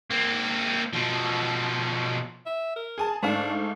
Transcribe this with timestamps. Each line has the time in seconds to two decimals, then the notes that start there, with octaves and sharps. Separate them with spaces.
0.10 A#3 C4
0.93 B2 F3
2.46 E5
2.76 A#4
2.98 G#4 G#5 A5
3.23 G#2 A3 D4 F5